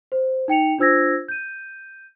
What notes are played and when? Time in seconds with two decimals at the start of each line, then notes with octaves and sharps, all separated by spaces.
0.12 C5
0.48 D#4 G5 C#7 F7
0.78 D4 F4 C5 E6 G#6 A#6
1.28 G6 D#7